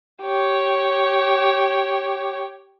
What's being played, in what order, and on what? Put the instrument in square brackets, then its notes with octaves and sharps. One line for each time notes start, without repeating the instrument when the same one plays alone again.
[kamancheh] G4 C#5